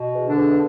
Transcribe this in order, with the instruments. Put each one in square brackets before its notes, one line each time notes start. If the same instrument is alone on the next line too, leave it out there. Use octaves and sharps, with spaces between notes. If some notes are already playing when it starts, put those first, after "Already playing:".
Already playing: [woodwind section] B2
E2
D3 D4
E2